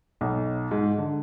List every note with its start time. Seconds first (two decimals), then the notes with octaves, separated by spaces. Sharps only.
0.21 B1
0.71 G#2
0.98 D3